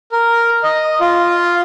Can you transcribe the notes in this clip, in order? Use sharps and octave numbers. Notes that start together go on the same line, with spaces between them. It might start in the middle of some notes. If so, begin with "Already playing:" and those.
A#4
D#5
F4